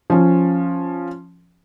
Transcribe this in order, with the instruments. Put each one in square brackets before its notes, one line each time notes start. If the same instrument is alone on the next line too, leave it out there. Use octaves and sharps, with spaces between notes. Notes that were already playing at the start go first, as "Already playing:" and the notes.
[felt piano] F3 C#4